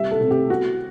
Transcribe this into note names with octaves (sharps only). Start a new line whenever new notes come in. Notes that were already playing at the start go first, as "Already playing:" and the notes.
Already playing: C3 G3 E5
A4
C3
G4
B3 F#4